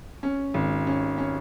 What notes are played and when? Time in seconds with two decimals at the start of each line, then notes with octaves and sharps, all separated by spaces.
0.23 C#4
0.54 G#1
0.87 C#4
1.18 C#4